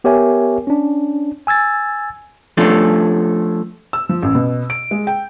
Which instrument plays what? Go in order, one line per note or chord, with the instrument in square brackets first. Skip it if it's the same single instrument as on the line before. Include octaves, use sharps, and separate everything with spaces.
[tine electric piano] B3 G4 A#4 C#5 E5 G#5
C#4 D4
G#5 E6 G#6 A6
[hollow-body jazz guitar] F3 A3 C#4 D4
[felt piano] E6
F3
A1
B2
D7
G#3
G5